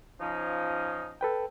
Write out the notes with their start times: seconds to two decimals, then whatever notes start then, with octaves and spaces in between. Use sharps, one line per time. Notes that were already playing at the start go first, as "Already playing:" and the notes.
0.20 F3 C#4 D#4
1.21 A4 B4 G5